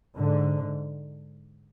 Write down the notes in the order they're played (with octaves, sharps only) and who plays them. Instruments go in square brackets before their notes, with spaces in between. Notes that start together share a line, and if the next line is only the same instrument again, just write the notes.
[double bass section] G#2 D3